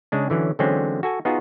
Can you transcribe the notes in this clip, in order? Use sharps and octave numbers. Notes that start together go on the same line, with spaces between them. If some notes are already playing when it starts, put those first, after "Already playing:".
C#3 G#3 D4
D3 E3 F#3 C#4
D3 E3 F#3 G#3 C4 C#4
F#4 A4 G#5
B3 D#4 F4 F#4 G#4